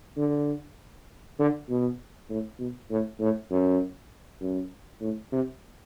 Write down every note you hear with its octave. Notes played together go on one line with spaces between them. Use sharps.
D3
D3
B2
A2
B2
A2
A2
F#2
F#2
A2
C3